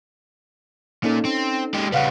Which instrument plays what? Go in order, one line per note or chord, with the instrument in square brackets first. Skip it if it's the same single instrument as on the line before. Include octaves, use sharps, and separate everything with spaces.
[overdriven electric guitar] A#2 [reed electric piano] C#4 D#4 A4
[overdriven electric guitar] C4
G#3 G4
[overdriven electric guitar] C#3 G3 [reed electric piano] B4 F5 F#5